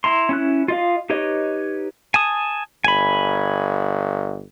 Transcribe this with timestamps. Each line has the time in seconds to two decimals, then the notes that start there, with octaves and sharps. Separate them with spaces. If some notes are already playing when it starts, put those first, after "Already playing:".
0.04 E4 A#5 C6
0.29 C#4 E4 F#6
0.68 F4 D#5 F5
1.10 D#4 G4 B4 C#5 D#5
2.14 G#5 A5 D#6
2.84 G1 G#5 B5